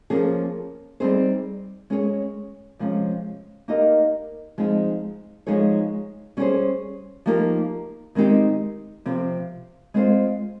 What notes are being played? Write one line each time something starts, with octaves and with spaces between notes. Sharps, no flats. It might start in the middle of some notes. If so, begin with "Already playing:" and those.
F3 A#3 C#4 G#4
G3 C4 D#4 G#4 C5
G#3 C#4 G#4 C#5
C3 F3 G#3 C#4
A#3 D#4 G4 A#4 D#5
F3 G#3 C4 D#4 G#4
F3 G#3 D#4 G#4 C#5
G3 C#4 G#4 C5
F3 A#3 D#4 G4
D#3 G#3 C4 D#4 G4
C3 F3 C4
G#3 C4 F4 C5